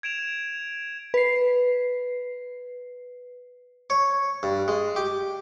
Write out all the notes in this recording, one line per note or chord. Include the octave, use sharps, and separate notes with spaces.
G#6 D7 E7 F7
B4 C7
C#5
G2
G#3
G4